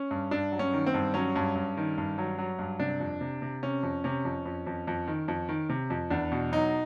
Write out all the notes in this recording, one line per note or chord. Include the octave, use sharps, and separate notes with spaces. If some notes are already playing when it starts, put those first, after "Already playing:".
Already playing: C#4
G2
G2 D4
F#3
C#4
D#3
C4
G2
F#3 C#4
G2
G2
D#3
G2
F#3
F#3
G2
C3 D4
F2
C3
C3
C3 C#4
F2
C3 C#4
F2
F2
F2
F2
D#3
F2
D#3
C3
F2
E2 D4
B2
F#3 D#4